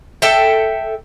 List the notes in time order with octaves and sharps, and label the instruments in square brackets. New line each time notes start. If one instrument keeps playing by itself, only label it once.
[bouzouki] A4 E5 G5